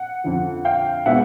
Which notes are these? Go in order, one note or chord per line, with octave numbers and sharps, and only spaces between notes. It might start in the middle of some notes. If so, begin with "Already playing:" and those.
Already playing: F#5
F2 D3 F3
F5 G5
B2 G#3 B3 D4 E5 F#5